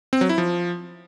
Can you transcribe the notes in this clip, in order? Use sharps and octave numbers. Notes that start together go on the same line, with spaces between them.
C4
F#3
E4
F3